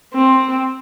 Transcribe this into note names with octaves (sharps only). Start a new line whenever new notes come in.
C4